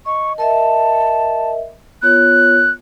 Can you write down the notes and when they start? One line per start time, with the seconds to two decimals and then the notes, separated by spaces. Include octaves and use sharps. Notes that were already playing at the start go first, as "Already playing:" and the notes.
0.06 D#5 C#6
0.38 A#4 D#5 E5 A5
2.03 B3 F4 C#5 F#6